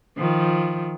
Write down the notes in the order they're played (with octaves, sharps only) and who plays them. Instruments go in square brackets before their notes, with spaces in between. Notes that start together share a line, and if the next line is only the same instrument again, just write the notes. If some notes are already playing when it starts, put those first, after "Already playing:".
[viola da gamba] D#3 F3